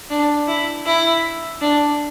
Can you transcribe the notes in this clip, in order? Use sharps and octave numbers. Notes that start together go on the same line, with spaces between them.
D4
E4
E4
D4